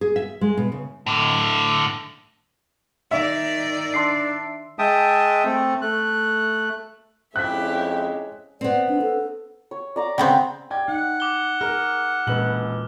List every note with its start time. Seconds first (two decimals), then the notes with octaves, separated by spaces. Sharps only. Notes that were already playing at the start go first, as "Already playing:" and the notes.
0.01 G#4
0.16 E5
0.41 G#3
0.57 B2
0.72 C#3
1.06 A2 D3
3.11 D#3 D5 E5
3.94 D4 C6 E6 C7
4.79 G#3 E5 G5 A5 D#6
5.45 A3 C4 A4
5.82 A3 F#6
7.36 F2 G#3 C#4 E4 G4 E5 F#6 B6
8.61 B3 C4 D5
8.89 D4
9.02 A4
9.71 C#5
9.96 D5 A#5 D6
10.18 C#3 B3 C4 G5 C#6
10.70 D5 G5 G#6
10.88 D#4 F#5
11.20 D6 G7
11.61 G#4 A#4 F6
12.27 E1 A#2 C#4 B4 F#7